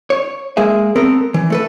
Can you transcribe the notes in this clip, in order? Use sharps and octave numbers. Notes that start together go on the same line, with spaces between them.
C#5
G#3 A#3 G#4 E5
B3 C4 A4 A#4
E3
A3 A4 B4